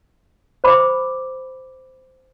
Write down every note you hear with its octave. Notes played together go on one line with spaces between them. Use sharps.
C5 B5 D6